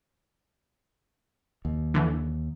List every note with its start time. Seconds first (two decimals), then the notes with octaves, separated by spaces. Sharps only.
1.65 D#2
1.94 D3 E3